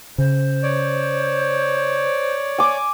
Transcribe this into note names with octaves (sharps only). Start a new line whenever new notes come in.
C#3 C5
C#5 D5
G#5 D6